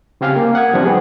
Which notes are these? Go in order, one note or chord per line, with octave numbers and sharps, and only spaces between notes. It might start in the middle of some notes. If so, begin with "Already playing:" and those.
C#3 C4 G4 F5 G#5 F6
A#3
F#5 D#6 G#6
F3 G3 C4 D4
B3 G#4